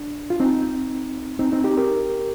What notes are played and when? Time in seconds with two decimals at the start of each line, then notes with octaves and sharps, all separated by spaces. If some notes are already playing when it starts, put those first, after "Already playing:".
Already playing: D4
0.30 F4
0.40 C4 D#4
1.39 C4 D#4
1.52 C4 D#4
1.64 D#4 G4
1.77 G4 A#4